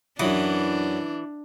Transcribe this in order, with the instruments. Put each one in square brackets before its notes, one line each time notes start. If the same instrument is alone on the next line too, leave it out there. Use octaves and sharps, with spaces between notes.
[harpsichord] F#2 F#3 D#6 [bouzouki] E3 [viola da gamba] D4